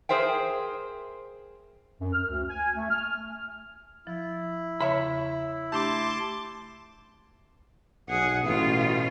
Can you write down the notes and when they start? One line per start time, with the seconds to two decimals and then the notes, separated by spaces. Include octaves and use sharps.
0.09 G#4 A#4 C5 E5 G5
2.01 F#2
2.13 F6
2.28 D2
2.49 G#5
2.76 A3
2.90 F6
4.07 F3 E4
4.80 E2 C#3 C#5 E5 B5
5.72 A3 D4 G4 A5 C6 D6
8.08 B1 G#4 F#5
8.45 A1 B2 F4